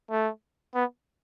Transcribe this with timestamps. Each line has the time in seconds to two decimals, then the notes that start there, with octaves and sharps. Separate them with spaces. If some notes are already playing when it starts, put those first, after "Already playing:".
0.10 A3
0.75 B3